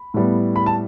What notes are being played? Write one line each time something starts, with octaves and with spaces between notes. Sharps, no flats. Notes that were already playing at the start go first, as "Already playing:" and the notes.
Already playing: B5
A2 G3 B3
B5
A5